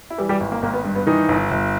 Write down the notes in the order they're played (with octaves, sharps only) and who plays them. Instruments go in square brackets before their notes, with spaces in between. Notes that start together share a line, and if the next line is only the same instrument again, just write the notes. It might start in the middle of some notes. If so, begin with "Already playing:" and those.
[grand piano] E4
E3 G3 G4
G3 G4
G#1
A#3
G#1 A#3
B3
G2
B3
D#3 E3 D#4
G1
G1